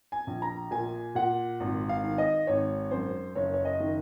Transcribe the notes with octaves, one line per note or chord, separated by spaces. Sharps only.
G#5
A#1
A#5
A#2 G#5
A#2 F#5
G#1
F5
D#3
D#5
G#1 C#5
F#2 C5
F#1 C#5
C#5
D#5
D#3